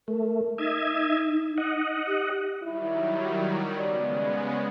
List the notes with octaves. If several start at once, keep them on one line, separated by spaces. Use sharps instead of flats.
A3 A#4
D#4 D#5 E5 G#6
D#5 F#5
G4
D#3 F#3 G3 E4
C#3 G#3 B3 D5